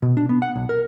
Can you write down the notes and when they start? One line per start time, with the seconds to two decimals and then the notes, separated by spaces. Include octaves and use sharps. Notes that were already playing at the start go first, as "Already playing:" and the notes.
0.02 B2
0.17 D4
0.29 B3
0.42 F#5
0.56 B1
0.69 A#4